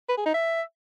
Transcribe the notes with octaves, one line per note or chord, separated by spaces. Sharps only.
B4
G#4
D#4
E5